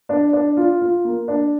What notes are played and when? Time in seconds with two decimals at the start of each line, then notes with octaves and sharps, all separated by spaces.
0.09 D4
0.33 D4
0.57 F4
0.81 F4
1.05 A#3
1.28 D4